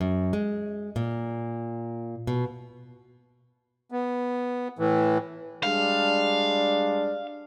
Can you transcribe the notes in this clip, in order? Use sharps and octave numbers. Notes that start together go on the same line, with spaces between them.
F#2
G#3
A#2
B2
B3
A2 E3
G3 G#3 D4 F5